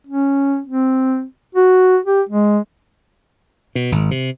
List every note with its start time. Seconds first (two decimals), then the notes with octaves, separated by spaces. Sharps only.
0.07 C#4
0.67 C4
1.55 F#4
2.05 G4
2.29 G#3
3.75 B2
3.92 G#1
4.11 C3